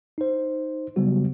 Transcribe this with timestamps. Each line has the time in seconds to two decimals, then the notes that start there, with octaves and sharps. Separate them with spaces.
0.18 D#4 C5
0.96 C#3 F#3 G3 B3 F#4